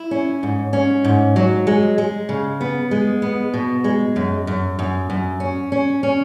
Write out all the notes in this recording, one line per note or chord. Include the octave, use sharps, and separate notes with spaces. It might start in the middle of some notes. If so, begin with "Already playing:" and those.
Already playing: E4
C#4
G#2
C#4
G#2
F#3
G#3
G#3
C#3
B3
G#3
B3
B2
G#3
F#2
F#2
F#2
F#2
C#4
C#4
C#4